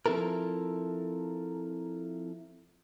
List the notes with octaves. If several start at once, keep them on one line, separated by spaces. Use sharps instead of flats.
F3 C4 E4 A4 A#4